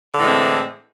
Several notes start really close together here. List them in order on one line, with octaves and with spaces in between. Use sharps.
D3 A2 E3 G#3 C4